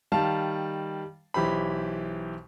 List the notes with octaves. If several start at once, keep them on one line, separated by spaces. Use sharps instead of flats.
D#3 G3 F5 A5
B1 E3 G4 C5 B5